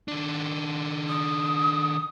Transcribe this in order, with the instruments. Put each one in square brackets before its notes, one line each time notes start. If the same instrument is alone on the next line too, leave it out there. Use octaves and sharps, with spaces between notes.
[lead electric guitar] D#3 D4
[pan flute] D#6